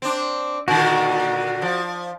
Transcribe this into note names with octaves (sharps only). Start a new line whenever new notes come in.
C4 D4
A#2 D3 D#3 F#4
F3